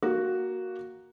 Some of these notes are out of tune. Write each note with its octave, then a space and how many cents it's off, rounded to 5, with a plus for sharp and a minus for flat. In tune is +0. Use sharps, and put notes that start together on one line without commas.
A#3 +0 F#4 +0